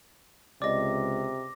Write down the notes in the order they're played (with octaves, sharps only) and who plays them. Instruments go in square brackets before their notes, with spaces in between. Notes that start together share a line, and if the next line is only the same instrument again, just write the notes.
[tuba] C#2 [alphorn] C3 [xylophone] D5 D#5 [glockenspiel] D6 A#6